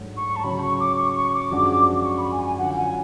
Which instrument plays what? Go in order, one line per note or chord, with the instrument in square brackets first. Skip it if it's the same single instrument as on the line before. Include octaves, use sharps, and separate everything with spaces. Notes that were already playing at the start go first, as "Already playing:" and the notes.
Already playing: [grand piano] G#2 F#3 A3 D4 F#4
[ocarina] C#6
A5
[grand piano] C#3 F#3 C#4 [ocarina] B5
[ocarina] C#6
D6
C#6
C#6
D6
[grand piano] F#2 F3 G#3 D4 F#4
[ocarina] D6
C#6
B5
G#5
G#5
[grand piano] D3 F#3 C#4 F4 [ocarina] F#5
[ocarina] G#5